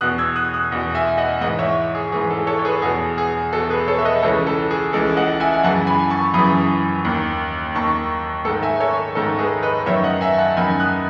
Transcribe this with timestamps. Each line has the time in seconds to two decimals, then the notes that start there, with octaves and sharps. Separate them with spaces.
0.01 E2 B2 D#6 F#6
0.18 E6 G#6
0.36 D#6 F#6
0.54 D#6 F#6
0.72 E2 B2
0.95 E5 G#5
1.18 D#5 F#5
1.41 G#2 E3 D#5 F#5
1.59 C#5 E5
1.95 G#4
2.12 G#2 E3 G#4
2.30 A4
2.47 A4 C#5
2.59 C#5
2.65 G#4 B4
2.82 E2 B2 G#4
3.18 G#4
3.53 E2 B2 A4
3.70 G#4 B4
3.88 A4 C#5
3.98 E5
4.05 B4 D#5
4.23 C#2 C#3 E3 A4 C#5
4.47 A4
4.71 G#4
4.93 C#2 C#3 E3 A4
5.16 D#5 F#5
5.40 E5 G#5
5.53 G#5
5.63 F#2 C#3 E3 F#5 A5
5.87 G#5 B5
6.10 A5 C#6
6.34 F#2 C#3 E3 B5 D#6
7.05 D#2 D#3
7.75 D#2 D#3 A5 C#6
8.45 G#2 A4
8.49 D#3
8.62 E5 G#5
8.80 A4 C#5
9.15 G#2 D#3 A4
9.39 G#4 B4
9.63 B4 D#5
9.86 F#2 D#3 C#5 E5
10.04 D#5 F#5
10.21 E5 G#5
10.38 F#5 A5
10.57 F#2 D#3 G#5 B5
10.80 D#6 F#6